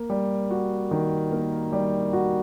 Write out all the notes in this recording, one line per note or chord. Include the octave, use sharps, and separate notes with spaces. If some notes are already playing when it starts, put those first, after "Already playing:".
Already playing: A#3
G3
F#4
D#3
A#3
G3
F#4